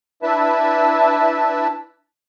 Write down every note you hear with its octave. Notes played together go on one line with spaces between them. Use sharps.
D4 E4 B4 E5 A5